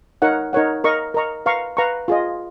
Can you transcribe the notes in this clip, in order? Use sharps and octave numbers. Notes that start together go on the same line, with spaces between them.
D#4 A#4 C#5 F#5
D#4 A#4 C#5 F#5
A#4 D#5 A#5 C#6
A#4 D#5 A#5 C#6
B4 F5 A#5 C#6
B4 F5 A#5 C#6
F4 G#4 D#5